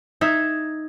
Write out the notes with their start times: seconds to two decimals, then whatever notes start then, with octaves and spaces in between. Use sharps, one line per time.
0.21 D#4 E5 G#6